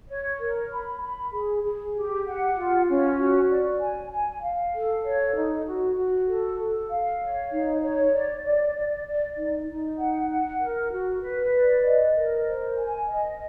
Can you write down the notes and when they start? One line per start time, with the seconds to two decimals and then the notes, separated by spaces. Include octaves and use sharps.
0.09 C#5
0.40 A#4
0.71 B5
1.02 B5
1.33 G#4
1.64 G#4
1.94 G4
2.26 F#5
2.56 F4
2.87 C#4
3.18 F#4
3.49 D5
3.80 G#5
4.11 G#5
4.42 F5
4.73 A4
5.04 C#5
5.35 D#4
5.66 F#4
5.97 F#4
6.27 A4
6.58 A4
6.89 F5
7.20 C#5
7.51 D#4
7.82 C#5
8.13 D5
8.44 D5
8.75 D5
9.05 D5
9.36 D#4
9.68 D#4
9.98 F#5
10.30 F#5
10.60 A#4
10.92 F#4
11.22 B4
11.53 D5
11.84 D#5
12.15 A#4
12.45 C5
12.77 G#5
13.08 D#5